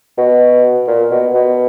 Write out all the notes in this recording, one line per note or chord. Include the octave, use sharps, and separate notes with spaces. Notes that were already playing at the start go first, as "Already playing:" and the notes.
B2
A#2
B2
B2